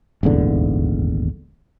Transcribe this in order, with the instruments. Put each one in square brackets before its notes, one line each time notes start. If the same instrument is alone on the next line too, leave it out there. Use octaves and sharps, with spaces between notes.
[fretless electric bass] D#1 G#1 E2 D3